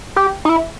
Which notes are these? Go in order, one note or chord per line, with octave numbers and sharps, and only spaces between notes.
G4
D#4
E4